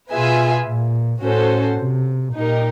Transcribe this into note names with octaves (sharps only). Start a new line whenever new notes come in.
B2 F4 G#4 B4 E5 G#5
A#2
A2 C#4 F#4 A4 C5
C3
A#2 D#4 G4 A#4